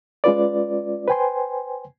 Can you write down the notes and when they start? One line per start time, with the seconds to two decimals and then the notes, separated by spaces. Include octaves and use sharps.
0.24 G#3 C#4 F4 B4 D5
1.08 B4 C5 G5 G#5 C6